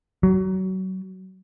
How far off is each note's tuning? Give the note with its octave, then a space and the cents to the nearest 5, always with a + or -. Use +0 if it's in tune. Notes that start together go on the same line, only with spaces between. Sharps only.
F#3 +25